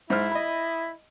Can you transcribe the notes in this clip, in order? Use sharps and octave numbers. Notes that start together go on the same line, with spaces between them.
G#2 E4 C5 F6
D#5 B5